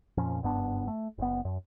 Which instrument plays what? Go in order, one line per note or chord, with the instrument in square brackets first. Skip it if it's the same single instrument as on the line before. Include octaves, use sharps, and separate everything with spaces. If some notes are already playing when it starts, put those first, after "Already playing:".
[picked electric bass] F2 A#2 F3 C#4
F#1 G2 B3 D4
A3
F#1 B3
F#2